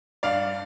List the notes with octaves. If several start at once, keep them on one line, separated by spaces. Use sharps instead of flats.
G2 D5 F5